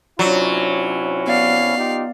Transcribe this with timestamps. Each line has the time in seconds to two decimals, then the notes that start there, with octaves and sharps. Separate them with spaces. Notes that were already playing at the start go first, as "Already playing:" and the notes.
0.19 C3 F#3 C#4 D4 E4 F4 D5
1.28 B3 D5 F5
1.75 D#4 F4 G4